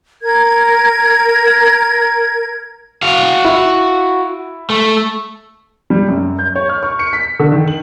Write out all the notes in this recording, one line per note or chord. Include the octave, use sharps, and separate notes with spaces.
A#4 G#6
F#4 F5
E4
A3
G3
F#2
G6
C#5
F6
C#6
C#7
B6
D3
D#3
F#7